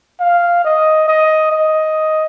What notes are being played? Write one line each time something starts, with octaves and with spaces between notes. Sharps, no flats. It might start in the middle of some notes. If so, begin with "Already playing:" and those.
F5
D#5
D#5
D#5